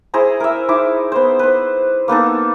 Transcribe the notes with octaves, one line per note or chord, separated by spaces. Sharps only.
E4 G#4 C5 A#5
A#4 E5
D#4 E4 D6
B3 C5
B4 C5
A#3 B3 D#4 A4